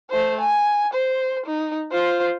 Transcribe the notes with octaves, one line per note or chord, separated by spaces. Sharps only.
A3 C5
G#5
C5
D#4
F4 C5